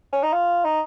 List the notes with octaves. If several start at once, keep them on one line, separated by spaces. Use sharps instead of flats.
C#4
D#4
F4
D#4